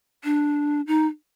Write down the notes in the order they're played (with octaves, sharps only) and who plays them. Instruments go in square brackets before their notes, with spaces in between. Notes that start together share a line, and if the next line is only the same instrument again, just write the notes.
[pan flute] D4
D#4